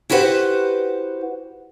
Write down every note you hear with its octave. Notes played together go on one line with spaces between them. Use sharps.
E4 F#4 G4 B4 C5 F#5